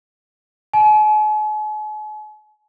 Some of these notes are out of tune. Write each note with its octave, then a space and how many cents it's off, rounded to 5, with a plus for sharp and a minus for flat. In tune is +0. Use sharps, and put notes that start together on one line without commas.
G#5 +45